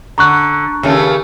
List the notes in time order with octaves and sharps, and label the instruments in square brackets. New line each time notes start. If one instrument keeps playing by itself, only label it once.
[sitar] D3 [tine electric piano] A#5 C#6 F#6
[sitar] D#2 C#3 A3